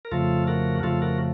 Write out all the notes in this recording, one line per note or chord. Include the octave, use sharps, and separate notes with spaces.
A#4
F2 C#3 F3 A3 F4 A4
F#4 A#4
F#4
F2 C#3 F3 A3 F4 A4
F#4 A#4